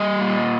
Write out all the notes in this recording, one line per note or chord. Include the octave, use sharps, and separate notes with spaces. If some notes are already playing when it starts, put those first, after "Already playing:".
Already playing: G3 D#5
A#2